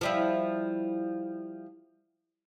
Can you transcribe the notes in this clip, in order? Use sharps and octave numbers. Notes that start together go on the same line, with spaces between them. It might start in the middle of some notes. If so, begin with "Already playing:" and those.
F3 G3 E4